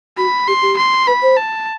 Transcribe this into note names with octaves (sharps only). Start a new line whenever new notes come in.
F#4 B5
G4 C6
G4
C6
B4 B5
C5
A5